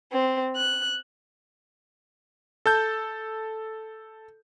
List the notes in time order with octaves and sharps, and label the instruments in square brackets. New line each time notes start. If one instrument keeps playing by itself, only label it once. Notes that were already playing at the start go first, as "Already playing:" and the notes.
[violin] C4
F#6
[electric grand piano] A4 A5 G6